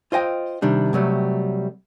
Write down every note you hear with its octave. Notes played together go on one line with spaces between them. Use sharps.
F4 C5 D#5 G5
C3 D#3 G3 D4
C3 F#3 G3 A3